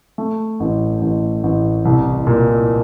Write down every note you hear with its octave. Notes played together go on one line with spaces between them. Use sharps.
A3
A1
A1
A1
C2
A#2